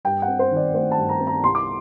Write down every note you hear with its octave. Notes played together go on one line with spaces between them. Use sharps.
G2 G5
F#5
C4
C5
D#3
D5
A3 C5
A5
G2
A#5
C4
A#5
C2 C6
D6